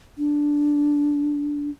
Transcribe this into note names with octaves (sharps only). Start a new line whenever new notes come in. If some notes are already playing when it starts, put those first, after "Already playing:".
D4